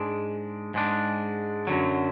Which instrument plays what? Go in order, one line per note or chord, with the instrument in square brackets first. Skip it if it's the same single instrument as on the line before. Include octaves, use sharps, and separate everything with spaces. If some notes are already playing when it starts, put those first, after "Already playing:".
Already playing: [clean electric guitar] G#2 G#3 D4
G#2 G#3 D4
F#2 D3 F#3